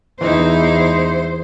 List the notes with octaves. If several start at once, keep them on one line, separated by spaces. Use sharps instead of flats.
E2 E3 D#4 E4 C5